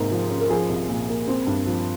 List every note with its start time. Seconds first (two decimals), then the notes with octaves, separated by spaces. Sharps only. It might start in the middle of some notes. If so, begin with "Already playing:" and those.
Already playing: G#2 C3 A#3 G#4
0.11 F3
0.30 C#4
0.41 A#4
0.49 F3 G#4
0.69 C2
0.89 A#2
1.09 A#3
1.28 C4
1.47 G2
1.66 F3